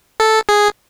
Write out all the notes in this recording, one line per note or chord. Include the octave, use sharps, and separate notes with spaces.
A4
G#4